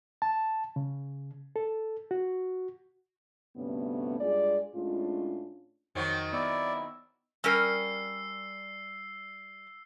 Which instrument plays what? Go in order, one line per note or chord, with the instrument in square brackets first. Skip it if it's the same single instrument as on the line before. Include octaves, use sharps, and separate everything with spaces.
[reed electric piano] A5
C#3
A4
F#4
[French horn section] D2 G2 C3 A3 B3 C#4
G2 G#3 F4 G#4 D5
A2 G#3 C#4 D4 F4
[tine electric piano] F2 [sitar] D#3 F#3 C4
[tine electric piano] B3 [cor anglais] E4 [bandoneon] D5
[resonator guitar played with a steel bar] G3 C#4 A#4 [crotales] E6 C7